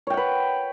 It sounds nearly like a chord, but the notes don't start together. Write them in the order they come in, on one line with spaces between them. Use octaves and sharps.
C#5 G5 F#5 B4